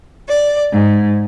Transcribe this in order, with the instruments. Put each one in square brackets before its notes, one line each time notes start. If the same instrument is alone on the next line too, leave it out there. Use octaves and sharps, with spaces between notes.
[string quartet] D5
G#2